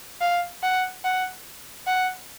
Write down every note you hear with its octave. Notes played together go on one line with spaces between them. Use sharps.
F5
F#5
F#5
F#5